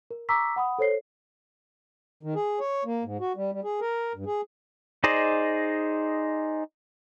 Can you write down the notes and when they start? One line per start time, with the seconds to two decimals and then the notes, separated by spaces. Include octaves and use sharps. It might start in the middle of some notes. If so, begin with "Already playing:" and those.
0.11 A#4
0.29 A#5 C#6 D6 E6 B6
0.56 F#5 B5 D#6
0.78 A4 C5 C#5 C7
2.23 D#3
2.35 G#4
2.60 C#5
2.85 A#3
3.04 G#2
3.20 F#4
3.36 G3
3.52 G3
3.64 G#4
3.81 A#4
4.14 G2
4.26 G#4
5.04 D#4 G#4 C5 D5 D#5